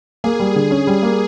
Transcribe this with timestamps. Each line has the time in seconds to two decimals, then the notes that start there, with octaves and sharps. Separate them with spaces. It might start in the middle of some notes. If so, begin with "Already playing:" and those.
0.24 A#3 G#4
0.40 G3
0.56 D3
0.71 C#4
0.87 G3
1.03 A#3